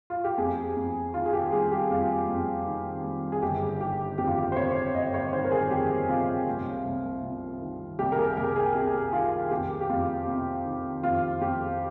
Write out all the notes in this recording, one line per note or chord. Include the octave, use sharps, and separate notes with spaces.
F4
G4
F2 G#4
F2
D#3 F4
G#4
G4
G3 G#4
G4
F2 F4
F2
D#3
G3
G#4
G1 G4
D#3 G4
F2 G4
F4
G4
C5
C3 C#5
G1 D#5
C#5
D#3 C5
A#4
G#4
F2 G4
C3 F4
C2
C2
C3
D#3
C2 G4
A#4
G#4
C2 A#4
G#4
C3 G4
D#3 F4
F2 G4
G4
F2 F4
C3
D#3
F2 F4
F2 G4